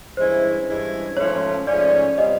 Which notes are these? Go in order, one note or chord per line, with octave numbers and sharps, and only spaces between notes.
G2 E3 G#3 C#4 E4 C5
G2 E3 G#3 C#4 E4
G#2 F3 A3 C#4 C#5
G#2 F3 A3 C#4 D5
B2 G3 C4 F4 D#5